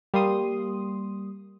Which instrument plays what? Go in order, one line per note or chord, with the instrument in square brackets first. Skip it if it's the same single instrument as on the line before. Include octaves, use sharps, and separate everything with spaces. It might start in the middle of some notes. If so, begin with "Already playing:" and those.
[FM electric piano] G3 A#3 C6 D#6